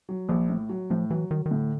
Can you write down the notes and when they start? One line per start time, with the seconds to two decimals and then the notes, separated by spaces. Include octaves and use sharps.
0.09 F#3
0.29 A#1 F3
0.49 A2
0.69 F#3
0.90 A2 F3
1.10 E3 F#3
1.31 D#3 F#3
1.46 D#3
1.51 A2 D3